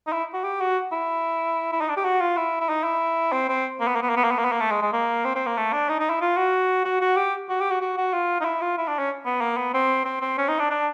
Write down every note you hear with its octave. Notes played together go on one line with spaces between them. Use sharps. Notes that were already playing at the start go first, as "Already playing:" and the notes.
D#4
E4
F#4
G4
F#4
E4
E4
D#4
D4
G4
F#4
F4
E4
E4
D#4
E4
C4
C4
A#3
B3
A#3
B3
A#3
B3
A#3
B3
A#3
B3
A#3
A3
G#3
G#3
A#3
C4
C4
A#3
A3
D4
D#4
D#4
E4
F4
F#4
F#4
F#4
G4
F#4
G4
F#4
F#4
F#4
F4
D#4
E4
F4
E4
D4
C#4
B3
A#3
B3
C4
C4
C4
C#4
D#4
D4
D4